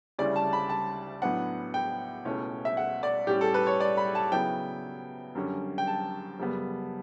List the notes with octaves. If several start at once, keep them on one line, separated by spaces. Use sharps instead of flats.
D2 C#3 G3 C#4 E4 D5
A5
B5
A5
A2 F#3 B3 D4 F#5
G5
C#2 B2 A3 C#4 E4
E5
F#5
D5
A2 G3 C#4 G4
A4
B4
C#5
D5
B5
A5
C#3 F#3 B3 E4 G5
F#2 D3 G3 C#4
G5
A5
F#2 C#3 G3 B3